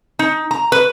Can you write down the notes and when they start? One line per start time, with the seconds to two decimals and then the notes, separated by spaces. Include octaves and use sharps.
0.19 D#4
0.51 A#5
0.72 B4